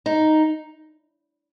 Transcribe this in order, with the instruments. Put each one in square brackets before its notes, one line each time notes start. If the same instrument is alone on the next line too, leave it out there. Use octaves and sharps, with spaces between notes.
[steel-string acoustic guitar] D#4